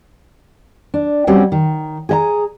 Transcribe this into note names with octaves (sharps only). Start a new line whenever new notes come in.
D4
G3 C4 C#4 F#4
D#3
G#4 D#5 A#5